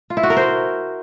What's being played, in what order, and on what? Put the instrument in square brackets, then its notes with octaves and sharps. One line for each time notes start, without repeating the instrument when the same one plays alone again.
[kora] F4
E4
F#4
A#4
C5